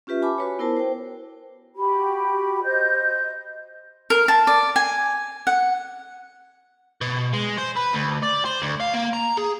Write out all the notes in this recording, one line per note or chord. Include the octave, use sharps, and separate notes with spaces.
C#4 F4 G4 B4 E5
G#5 A5 B5 D6
F#4 B4 C#5
B3 E4 A#4 C5 A5
C5 G5
F#4 G4 B5
C5 D#5 G6
A#4
A5
D5
G#5
F#5
B2
G#3
C5
B4
D2
D5
C5
D2
F5
A#3
A#5
G#4